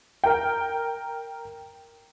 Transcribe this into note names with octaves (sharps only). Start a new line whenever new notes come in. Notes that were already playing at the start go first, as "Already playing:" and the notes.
A#4 G5